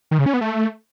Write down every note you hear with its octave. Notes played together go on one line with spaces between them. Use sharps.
D#3
C#3
C#4
B3
A3